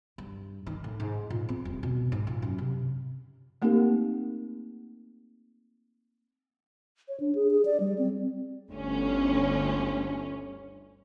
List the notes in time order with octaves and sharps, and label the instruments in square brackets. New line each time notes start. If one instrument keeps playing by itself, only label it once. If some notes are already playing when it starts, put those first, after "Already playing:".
[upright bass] G2
D#3
A2
G#2
A#2
C4
D#1
B2
G#2
A#2
F#2
C3
[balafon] A3 A#3 C4 D#4 G4 A#4
[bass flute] C#5
D4
G#4
G#4
D5
G3
C4
[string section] G1 D2 C#4